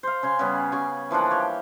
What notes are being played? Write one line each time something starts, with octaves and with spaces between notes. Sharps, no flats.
C5 F5
C#3 G#5 C6
C#3 G3 B3 C#4
C#3 G#5 C#6 D6
E3 F3 A#3 D4
G4 C#5